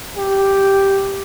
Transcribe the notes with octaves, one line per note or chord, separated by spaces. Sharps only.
G4